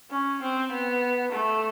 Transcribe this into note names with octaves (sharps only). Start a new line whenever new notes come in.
C#4
C4
B3
A3